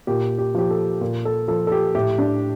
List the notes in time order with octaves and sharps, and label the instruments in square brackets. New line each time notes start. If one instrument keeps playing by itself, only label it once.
[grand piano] A#2 G4
G4
F3 G4
A4
A#2
A4
F3 A4
A4
G4
A2 G4
D4